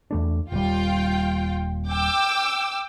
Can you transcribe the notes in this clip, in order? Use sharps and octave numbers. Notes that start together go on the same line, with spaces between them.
E2 A3 D4
D#1 G3 F4 G5
G5 D6 E6